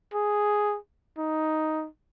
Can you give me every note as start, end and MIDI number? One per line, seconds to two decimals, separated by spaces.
0.14 0.77 68
1.18 1.87 63